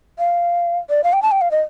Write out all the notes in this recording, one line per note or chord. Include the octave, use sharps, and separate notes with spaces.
F5
D5
F5
G5
A5
G5
F5
D#5